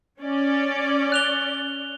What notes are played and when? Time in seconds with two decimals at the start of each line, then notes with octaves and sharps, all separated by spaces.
0.20 C#4 D5
1.12 F#6 F7 G7